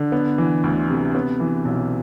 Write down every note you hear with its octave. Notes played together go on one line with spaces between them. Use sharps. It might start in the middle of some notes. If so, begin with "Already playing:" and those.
Already playing: D3
B3
E3
D2
C3
B3
E3
B1